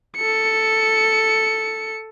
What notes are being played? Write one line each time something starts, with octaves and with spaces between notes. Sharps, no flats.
A4 C#7